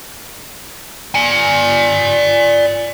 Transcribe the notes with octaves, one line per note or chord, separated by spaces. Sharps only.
D5 G#5